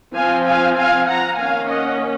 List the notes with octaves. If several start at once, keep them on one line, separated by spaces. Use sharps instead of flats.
F3 C4 F5 G#5
F5 G#5
F5 G#5
F#5 A#5
D#3 A#3 C#4 F5 G#5
D#5 F#5